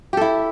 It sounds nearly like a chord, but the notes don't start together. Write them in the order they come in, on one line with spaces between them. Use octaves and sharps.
G4 A4 E4